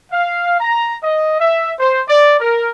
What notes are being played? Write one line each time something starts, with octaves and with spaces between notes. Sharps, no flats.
F5
A#5
D#5
E5
C5
D5
A#4